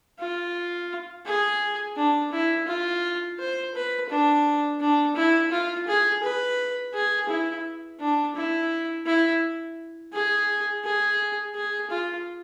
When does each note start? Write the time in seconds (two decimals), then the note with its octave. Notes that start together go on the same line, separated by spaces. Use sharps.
0.19 F4
1.25 G#4
1.96 D4
2.32 E4
2.67 F4
3.39 C5
3.74 B4
4.09 D4
4.80 D4
5.16 E4
5.52 F4
5.87 G#4
6.23 B4
6.94 G#4
7.29 E4
7.99 D4
8.35 E4
9.06 E4
10.13 G#4
10.84 G#4
11.54 G#4
11.90 F4